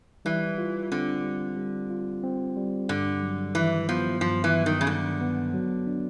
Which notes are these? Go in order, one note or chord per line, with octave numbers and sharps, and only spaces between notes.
E3 G3
F4
D3 C4
G3
G3
F4
C4
G3
G2 D3
F#3
D#3 E3
F3 B3
G2 F3
E3
F#3
D#3
C#3
D3 D#3
B3
F#3
D4